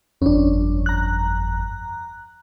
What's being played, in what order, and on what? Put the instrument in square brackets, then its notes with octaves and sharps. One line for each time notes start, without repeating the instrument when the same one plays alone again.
[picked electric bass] G1 F2 [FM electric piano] C#4 D4
[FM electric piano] A#5 F#6